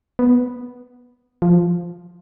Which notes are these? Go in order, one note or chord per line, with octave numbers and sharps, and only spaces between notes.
B3
F3